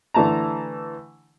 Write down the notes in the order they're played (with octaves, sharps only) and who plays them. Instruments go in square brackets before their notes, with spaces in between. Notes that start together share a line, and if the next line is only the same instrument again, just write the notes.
[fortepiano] D3 E3 A3 A5 A#5